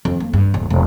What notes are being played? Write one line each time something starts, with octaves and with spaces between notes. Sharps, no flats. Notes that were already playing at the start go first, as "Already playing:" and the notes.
F2
A#3
G2
D1
E1